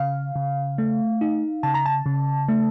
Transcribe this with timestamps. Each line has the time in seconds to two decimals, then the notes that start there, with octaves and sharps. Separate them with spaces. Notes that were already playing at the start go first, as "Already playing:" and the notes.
Already playing: C#3 F5
0.36 C#3
0.78 A3
1.21 D#4
1.63 C#3 A5
1.74 A#5
1.86 A5
2.06 C#3
2.48 A3